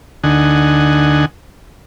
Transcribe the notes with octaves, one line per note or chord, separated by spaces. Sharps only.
D2 D3 D#4 F#5 G#5